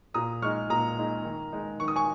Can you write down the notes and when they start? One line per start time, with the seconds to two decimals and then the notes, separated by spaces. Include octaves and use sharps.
0.14 A#2 A#5 D#6
0.42 G#3 D#4 C#6 F6
0.70 A#2 A#5 D#6
0.98 G#3 D#4
1.25 D#3
1.52 G#3 D#4
1.80 D#3 C#6
1.88 D#6
1.96 G#5 C#6